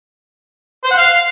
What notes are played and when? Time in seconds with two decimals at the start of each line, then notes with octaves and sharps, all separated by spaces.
0.84 C5
0.91 F#5
0.98 F5